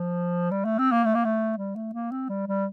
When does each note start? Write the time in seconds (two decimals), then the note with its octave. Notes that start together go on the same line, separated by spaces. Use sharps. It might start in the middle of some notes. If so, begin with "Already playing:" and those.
Already playing: F3
0.51 G3
0.65 A3
0.79 C4
0.92 A#3
1.05 A3
1.15 A#3
1.25 A3
1.58 G3
1.76 A3
1.94 A#3
2.11 C4
2.29 G3
2.48 G3